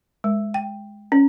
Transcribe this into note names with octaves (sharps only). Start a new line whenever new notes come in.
G#3
G5
C#4